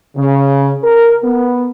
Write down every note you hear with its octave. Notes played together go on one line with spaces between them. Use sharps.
C#3
A#4
B3